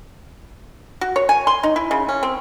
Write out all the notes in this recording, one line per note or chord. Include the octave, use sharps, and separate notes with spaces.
F#4
C#5
G#5
C6
D#4
E4
C#3
C#4
C4